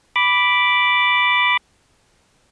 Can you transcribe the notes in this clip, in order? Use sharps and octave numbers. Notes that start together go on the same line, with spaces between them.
B5 D6